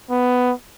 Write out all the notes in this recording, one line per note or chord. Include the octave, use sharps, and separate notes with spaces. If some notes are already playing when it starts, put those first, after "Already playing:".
B3